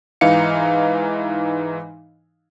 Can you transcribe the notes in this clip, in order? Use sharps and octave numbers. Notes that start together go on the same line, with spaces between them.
G#2 E3 D#4 F5 C#7